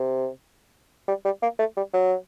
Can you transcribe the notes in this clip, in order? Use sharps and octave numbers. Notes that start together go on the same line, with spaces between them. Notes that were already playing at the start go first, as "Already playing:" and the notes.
Already playing: C3
G3
G3
A#3
A3
G3
F#3